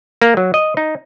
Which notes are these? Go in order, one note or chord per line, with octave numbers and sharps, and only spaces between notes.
A#3
F#3
D#5
D#4